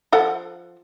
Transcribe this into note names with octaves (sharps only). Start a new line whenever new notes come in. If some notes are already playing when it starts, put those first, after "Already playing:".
F3 A4 F#5